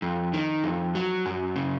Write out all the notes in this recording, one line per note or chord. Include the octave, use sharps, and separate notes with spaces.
F2
D#3
F2
F#3
F#2
C#3